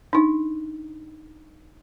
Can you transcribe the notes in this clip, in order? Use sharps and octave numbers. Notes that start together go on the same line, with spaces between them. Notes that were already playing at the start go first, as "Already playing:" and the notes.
D4 D#4